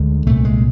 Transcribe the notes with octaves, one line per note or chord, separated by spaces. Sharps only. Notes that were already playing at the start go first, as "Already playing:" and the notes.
Already playing: D2 D3 G#3
C2 A#2 A3
G#3